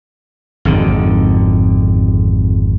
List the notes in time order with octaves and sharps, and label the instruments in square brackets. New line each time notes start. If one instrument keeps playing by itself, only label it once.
[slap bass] G#1 F2 D3 D#3